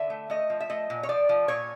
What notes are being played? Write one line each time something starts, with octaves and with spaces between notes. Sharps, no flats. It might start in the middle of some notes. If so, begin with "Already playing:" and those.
Already playing: D3 E5
A3
A3 D#5
F3
E5
A3 D#5
A#2
C#5
F3 D5
F3
A#2 C#5